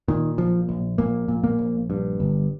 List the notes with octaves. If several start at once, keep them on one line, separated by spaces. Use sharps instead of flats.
A#2 D#3
A#1 F3
A#1
A#1 A#2 A#3
A#2
A#2 A#3
A#1
G2
G1